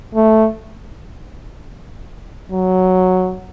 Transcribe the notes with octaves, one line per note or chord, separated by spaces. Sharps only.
A3
F#3